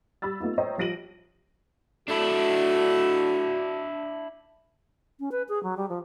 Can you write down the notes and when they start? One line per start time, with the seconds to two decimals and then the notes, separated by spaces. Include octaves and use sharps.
0.22 G3 B5 E6 A6
0.40 A3 B3 D#4 F4
0.58 C5 C#5 D#5 E5 G5 A#5
0.78 F3 G3 A#6 D7 D#7 F#7
2.08 A3 D4 E4 F#4
5.20 C#4
5.32 B4
5.49 G#4
5.63 F#3
5.77 G3
5.89 F3